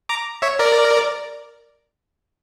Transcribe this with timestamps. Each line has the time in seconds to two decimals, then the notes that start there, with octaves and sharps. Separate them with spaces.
0.09 A#5 D6
0.42 C#5 E5
0.59 A#4 D5